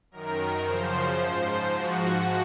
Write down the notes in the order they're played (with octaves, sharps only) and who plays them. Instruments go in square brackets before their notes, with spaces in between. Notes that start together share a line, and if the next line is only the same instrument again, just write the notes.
[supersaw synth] F#2 D#3 A#4
F#2 C#3 F3 C5
G#2 F3 C5
G#2 F3 F#4